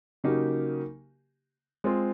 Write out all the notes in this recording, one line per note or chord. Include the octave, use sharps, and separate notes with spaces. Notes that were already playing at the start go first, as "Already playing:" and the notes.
C#3 F#3 A#3 D#4 G4
G#3 C4 F4